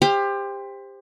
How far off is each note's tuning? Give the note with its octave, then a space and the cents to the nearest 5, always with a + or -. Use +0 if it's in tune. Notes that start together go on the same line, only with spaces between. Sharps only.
G4 +25 C5 +0 F5 +0